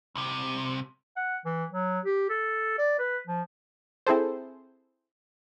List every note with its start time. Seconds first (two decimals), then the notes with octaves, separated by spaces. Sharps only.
0.15 C2 C3
1.17 F#5
1.45 E3
1.71 F#3
2.05 G4
2.30 A4
2.78 D5
2.99 B4
3.27 F3
4.07 C4 E4 G#4 A4 C5